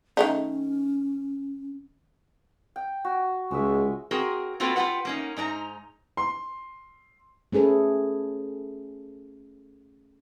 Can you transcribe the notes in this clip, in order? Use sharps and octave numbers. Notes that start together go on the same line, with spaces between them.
D#3 A3 C#4 D#4
G5
F#4
C#2 G#3 B4 E5
C4 F#4 G#4 A#4
A#3 C4 F4 F#4 A4 B4
F4 G4 G#4 B4 F#5
A#3 C#4 D#4
G#2 D4 D#4 A#5
C6
A3 C#4 G#4 A4 B4